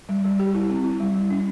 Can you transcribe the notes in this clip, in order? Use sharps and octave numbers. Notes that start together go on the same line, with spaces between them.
G3
G3
G4
E4
C4
E4
G3
G3
C#4